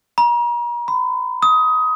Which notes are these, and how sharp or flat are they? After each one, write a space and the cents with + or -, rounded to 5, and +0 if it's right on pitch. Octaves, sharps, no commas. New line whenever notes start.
A#5 +40
B5 +40
D#6 +20